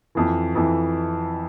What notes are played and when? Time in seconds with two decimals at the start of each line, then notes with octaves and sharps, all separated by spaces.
0.15 F2 E3
0.55 F2 E3